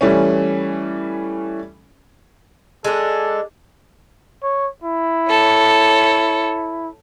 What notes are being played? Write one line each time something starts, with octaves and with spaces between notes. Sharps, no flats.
E3 G3 A3 C#4
G#3 D4 A4
C#5
E4
A4 C#5